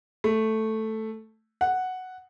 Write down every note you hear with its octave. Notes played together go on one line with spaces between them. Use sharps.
A3
F#5